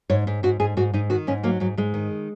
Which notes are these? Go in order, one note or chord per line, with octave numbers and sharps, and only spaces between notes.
G#2 C#5
G#2
G#2 F#4
G#2 G#4
G#2 F#4
G#2 D#4
D#3 F#4
G#2 C#4
F#3 A#3
G#2 F#3
G#2 G#3
D#3